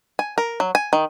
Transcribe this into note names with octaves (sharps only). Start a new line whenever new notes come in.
G#5
A#4
F#3
G#5
D#3